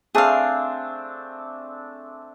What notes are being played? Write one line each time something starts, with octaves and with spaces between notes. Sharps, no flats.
A3 C4 D4 G#4 F5